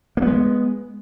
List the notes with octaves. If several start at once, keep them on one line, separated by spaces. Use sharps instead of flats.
G#3 A#3 B3